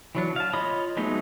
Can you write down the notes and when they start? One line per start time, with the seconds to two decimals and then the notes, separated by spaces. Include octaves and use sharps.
0.15 E3 F#3 D4
0.36 F5 A5
0.53 F4 C#5 D#5 B5 D#6
0.97 F#3 G#3 A3 B3 D#4